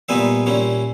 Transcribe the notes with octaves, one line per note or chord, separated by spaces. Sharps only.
A#2 G3 B3 D#4 E5 G#5
A#2 G3 C#4 E4